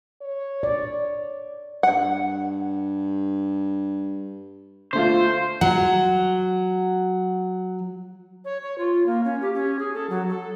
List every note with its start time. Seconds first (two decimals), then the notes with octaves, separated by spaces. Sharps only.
0.22 C#5
0.63 D5
1.83 G2 F#5
4.93 D3 A3 F4 C5
5.61 F#3 F#5
8.45 C#5
8.62 C#5
8.78 F4
9.06 A#3
9.24 C#4
9.41 G4
9.54 C#4
9.79 G#4
9.94 A4
10.10 F#3
10.29 A4